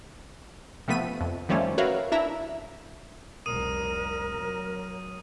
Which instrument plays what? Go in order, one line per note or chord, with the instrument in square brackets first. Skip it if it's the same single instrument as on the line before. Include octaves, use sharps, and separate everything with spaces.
[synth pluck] C3 F3 A3 B3 B6 D#7
F2
D#3 F3 G3 A3 C#4
F#4 A#4 B4 C#5 E5 F5
D4 E4 E5 A#5
[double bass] F1 C2 [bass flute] A#4 [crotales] D#6 D#7
[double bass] F#3